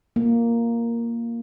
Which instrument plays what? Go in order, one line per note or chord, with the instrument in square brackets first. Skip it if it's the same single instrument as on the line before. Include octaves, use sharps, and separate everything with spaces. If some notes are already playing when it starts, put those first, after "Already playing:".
[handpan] A#3